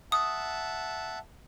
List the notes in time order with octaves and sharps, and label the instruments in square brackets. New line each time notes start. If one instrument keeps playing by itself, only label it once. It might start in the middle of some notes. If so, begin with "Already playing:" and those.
[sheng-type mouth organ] E5 F#5 A5 [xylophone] D#6